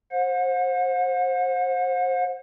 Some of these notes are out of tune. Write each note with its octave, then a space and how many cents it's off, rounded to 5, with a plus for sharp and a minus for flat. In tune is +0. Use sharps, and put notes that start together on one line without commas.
C5 +20 F#5 -35